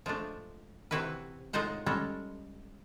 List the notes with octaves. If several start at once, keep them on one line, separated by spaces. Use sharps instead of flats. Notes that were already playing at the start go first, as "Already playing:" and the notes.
F3 G#3 A3 D4
C3 E3 C4 E4 F#4 B4
A2 G#3 D#4 F4 C5 F#5
G3 G#3 C#4 A4